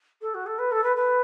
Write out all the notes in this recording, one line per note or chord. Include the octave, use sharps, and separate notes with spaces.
A4
F#4
A4
B4
A4
B4
B4